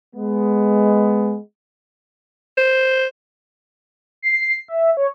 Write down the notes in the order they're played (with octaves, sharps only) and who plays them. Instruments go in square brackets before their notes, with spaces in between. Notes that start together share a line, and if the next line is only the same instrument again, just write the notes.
[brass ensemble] G#3 B3
[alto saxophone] C5
[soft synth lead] C7
E5
C#5